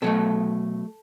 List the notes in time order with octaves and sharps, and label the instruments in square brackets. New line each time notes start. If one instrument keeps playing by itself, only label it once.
[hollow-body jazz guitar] B2 F#3 A3 A4